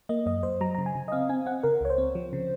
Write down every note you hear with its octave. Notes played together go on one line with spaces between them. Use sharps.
A#3 D#5
F#2 D#5
F#2 C5
F#3 A#5
C#3 A#5
G#5
C#3
D#5
C4 F5
C4 G#5
C4 F#5
C#3 A#4
C#2 C#5
C5
C4
F3
C#3